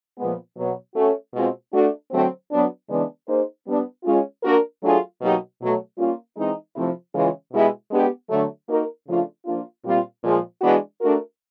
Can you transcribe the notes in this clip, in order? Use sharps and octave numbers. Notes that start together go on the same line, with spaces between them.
A#2 F3 G#3 B3
B2 F#3 B3
A3 C#4 F#4
B2 G#3 C4 F4
A3 D4 F#4
D3 F#3 A3 C4
F#3 B3 D4
C#3 E3 G#3 B3 D4
A#3 D#4 G#4 C5
G3 B3 D4
G#3 C#4 F4
A#3 D4 F#4 A#4
F#3 A3 D4 F4 G#4
B2 F#3 A#3 D#4 G4
B2 F#3 A3
G3 A#3 C#4 F4
E3 G#3 C4 D#4
C3 F3 A3 C4 E4
C#3 E3 G#3 C#4 F4
B2 G#3 B3 E4 G4
G#3 B3 D4 G4
D3 F#3 A3
A#3 D#4 F#4 A#4
C#3 F3 A3 D4 F4
F3 A#3 D4 F4
A#2 G3 C4 F4
A#2 F3 G#3
E3 G#3 B3 D4 F#4
A3 D4 F#4 A#4